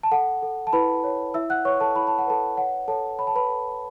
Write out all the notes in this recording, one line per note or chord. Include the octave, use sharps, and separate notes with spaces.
A5
A4 F#5
A4
A5
E4 B4 B5
C#5
E4 E5 E6
F#5 F#6
B4 C#5 C#6
A4 A5
E4 B5
A5
F#5
A4 B4 A5
C#5 F#5
A4 C#5 A5
C#5 B5
A5
B4 B5
A4